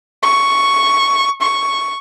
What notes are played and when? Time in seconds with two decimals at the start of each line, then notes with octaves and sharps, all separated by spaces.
0.23 C#6
1.41 C#6